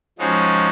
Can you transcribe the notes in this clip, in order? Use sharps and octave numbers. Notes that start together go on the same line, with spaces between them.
F3 G#3 C#4 D#4 F#4